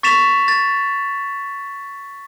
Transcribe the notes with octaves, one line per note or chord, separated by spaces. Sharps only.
C#6 A6 B6 E7 F7
A6